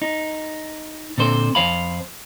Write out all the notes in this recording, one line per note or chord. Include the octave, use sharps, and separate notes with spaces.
D#4
A#2 D3 C4 C5
F2 C5 F5 B5